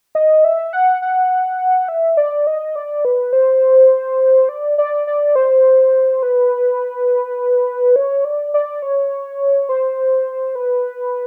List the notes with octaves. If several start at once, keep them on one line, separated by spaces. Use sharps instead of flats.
D#5
E5
F#5
F#5
E5
D5
D#5
D5
B4
C5
D5
D5
D5
C5
B4
C#5
D5
D5
C#5
C5
B4